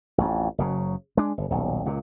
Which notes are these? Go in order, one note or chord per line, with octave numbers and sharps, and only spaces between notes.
A1 F2
F#1 C#3 F#3
G#3 D4
G1
D#1 B1
C#2 A#2